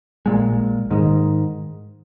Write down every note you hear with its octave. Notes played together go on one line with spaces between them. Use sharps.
A#1 A#2 G#3
G#2 D#3 G#3